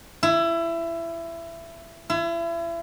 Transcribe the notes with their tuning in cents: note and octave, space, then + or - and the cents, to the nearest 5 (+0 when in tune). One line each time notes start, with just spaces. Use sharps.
E4 +20
E4 +35